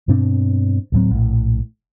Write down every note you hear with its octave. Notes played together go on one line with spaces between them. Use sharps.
G2 B2 C4 D4
D1 A2 F#3 C4
A#1 A2